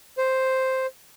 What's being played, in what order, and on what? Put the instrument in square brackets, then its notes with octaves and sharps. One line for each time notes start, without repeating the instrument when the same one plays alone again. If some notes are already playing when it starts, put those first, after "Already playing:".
[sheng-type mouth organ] C5